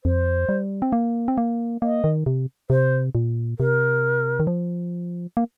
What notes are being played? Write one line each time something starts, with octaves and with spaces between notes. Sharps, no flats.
F2 C5
G3
C4
A#3
C4
A#3
A#3 D#5
D#3
C3
C3 C5
A#2
C3 A#4
D#3
F3
A#3